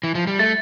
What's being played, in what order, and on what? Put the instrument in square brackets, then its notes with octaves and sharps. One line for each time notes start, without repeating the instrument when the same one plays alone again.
[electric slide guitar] E3
F3
G3
[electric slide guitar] A3 [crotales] A6